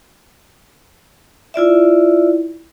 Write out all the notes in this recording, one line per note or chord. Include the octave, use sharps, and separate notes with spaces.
E4 F4 D5 E5